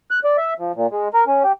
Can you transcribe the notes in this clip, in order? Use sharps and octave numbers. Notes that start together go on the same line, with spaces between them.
F#6
D5
E5
F3
A#2
G#3
A#4
C#4
G4